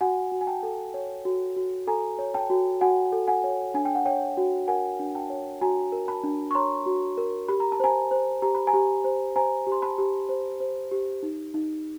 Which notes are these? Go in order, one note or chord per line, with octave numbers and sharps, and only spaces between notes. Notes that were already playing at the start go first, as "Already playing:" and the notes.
F#4 F#5 G#5
F#4
G#5
G5 A5
A4
C#5
F#4
F#4
A4 G#5 A#5
C#5
G5 A5
F#4
F#4 F#5 G#5
A4
F#5 G#5
C#5
D4 G#5
G5
F#5
C#5 G5
F#4
A#4 F#5 G#5
D4
G5 A5
C#5
F#4 G#5 A#5
A#4
A5 B5
D4
C#6
C#5 A#5 C6
F#4
A#4
G4 B5
A#5
A5
C5 G#5 A#5
C5
G4 A#5
B5
G#5 A#5
G4
C5
C5 G#5 A#5
G4
C6
A5 B5
G4
C5
C5
G4
D#4
D#4